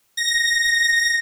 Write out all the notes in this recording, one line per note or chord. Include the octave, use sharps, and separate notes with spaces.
A#6